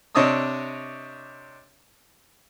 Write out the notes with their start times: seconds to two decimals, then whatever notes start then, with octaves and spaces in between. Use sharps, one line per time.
0.15 C3 D4 C#5 D#5 D#6 E6